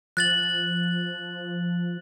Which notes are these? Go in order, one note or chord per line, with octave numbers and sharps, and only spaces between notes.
F3 F#6 A6 F#7